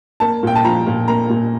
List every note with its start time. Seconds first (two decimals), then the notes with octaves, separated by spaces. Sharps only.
0.20 A#3 A5
0.43 A#2 G5
0.55 A5
0.65 F3 A#5
0.87 A#2
1.08 A#3 A#5
1.29 A#2